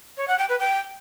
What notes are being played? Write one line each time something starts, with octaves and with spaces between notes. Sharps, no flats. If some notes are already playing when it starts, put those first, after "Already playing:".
C#5
F#5
G5
B4
G5